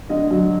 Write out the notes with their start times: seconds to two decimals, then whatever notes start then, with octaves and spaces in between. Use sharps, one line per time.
0.09 D3 D#5
0.31 F#3